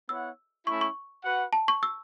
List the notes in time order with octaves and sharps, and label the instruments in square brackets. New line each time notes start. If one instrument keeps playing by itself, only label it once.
[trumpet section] B3 E4 C#5 F#5 [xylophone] E6
[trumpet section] A3 C#4 E4 [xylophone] C#6
[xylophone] C#6
[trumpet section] F#4 B4 F#5
[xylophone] A5
C#6
E6